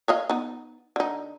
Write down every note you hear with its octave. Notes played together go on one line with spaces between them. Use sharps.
C#5 D#5 F5
B3 D#4
D3 D#4